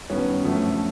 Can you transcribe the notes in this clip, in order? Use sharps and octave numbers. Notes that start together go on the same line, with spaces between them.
G2 D#3 F#3 B3 C#4
F#2 D3 F3 A3